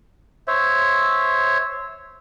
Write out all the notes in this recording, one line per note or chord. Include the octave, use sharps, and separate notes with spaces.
C5 C#5 E5